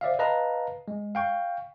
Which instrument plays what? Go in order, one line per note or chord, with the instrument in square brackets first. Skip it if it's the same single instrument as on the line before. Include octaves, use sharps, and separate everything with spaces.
[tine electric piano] C5 D5 E5 F5
B4 D#5 F5 A5 A#5
G#3
F5 G5 C#6